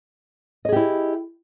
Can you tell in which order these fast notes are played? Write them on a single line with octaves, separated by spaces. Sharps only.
D#5 G#4 G4 E4